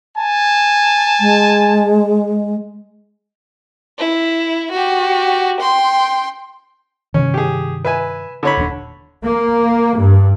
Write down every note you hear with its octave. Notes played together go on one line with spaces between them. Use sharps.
G#5 A5
G#3
E4
F#4 G4
G5 C6
G2 C3 D#3 C#4
G4 G#4
B4 E5 G#5
D3 C#5 B5
D#1 D4
A#3
G2